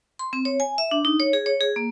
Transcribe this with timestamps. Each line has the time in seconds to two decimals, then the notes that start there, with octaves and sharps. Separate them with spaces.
0.19 C6
0.33 C4
0.45 C#5
0.60 G#5
0.78 E5
0.91 D4
1.05 D#4
1.20 C#5
1.33 G#4
1.46 C#5
1.61 G#4
1.76 A#3